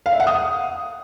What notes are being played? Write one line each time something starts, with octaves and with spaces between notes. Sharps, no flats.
F5
E5
F#5
D#6